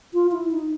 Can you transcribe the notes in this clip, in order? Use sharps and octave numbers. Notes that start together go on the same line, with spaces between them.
F4
E4
D#4